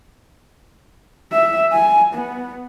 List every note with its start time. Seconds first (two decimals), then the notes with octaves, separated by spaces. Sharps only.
1.32 E5
1.72 G#5
2.14 B3